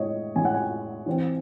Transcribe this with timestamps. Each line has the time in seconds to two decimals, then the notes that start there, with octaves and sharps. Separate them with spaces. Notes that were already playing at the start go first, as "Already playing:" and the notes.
Already playing: A2 G#3 C#5 D#5
0.36 A2 G#3 C#4 G#5
0.45 F#5
0.54 G#5
1.06 E3 C4 E4